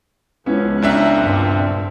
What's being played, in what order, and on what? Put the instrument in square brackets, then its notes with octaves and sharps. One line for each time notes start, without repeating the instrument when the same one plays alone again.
[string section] C#2 F3 [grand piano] B3 C#4 E4
[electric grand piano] C#2 D4 E5 [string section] A#5 F#6
[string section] G2 A#2 C4